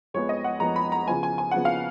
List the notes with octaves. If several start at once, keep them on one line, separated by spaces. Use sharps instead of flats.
F2 F3 G#3 B3 C#5
D#5
F#5
F2 F3 G#3 B3 A#5
B5
A#5
C#3 F3 B3 G#5
G#5
G#5
C#3 F3 B3 F#5
F5